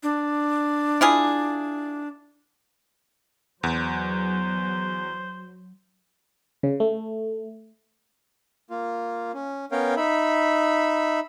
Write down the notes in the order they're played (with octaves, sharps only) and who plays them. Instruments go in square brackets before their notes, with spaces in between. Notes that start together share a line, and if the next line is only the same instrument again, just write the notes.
[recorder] D4
[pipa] E4 F4 G#4
[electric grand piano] E2 [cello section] F#3 [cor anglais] C5
[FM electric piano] C#3
A3
[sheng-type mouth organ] A#3 F4
C#4
B3 C#4 A#4 C#5 F5 G5
D#4 E5 B5